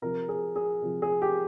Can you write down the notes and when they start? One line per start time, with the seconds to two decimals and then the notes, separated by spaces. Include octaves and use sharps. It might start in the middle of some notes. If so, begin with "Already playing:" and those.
0.02 C3 F3 A#4
0.29 G#4
0.56 G#4
0.82 C3 F3
1.02 G#4
1.22 G4